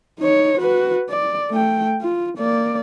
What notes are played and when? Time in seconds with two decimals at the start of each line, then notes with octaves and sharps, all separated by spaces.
0.20 D#4 C#5
0.60 F#4 B4
1.10 D5
1.50 A3 G5
2.02 F4
2.38 A#3 D5